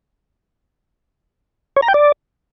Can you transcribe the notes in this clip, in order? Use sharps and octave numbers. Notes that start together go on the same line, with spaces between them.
C#5
A#5
G5
D5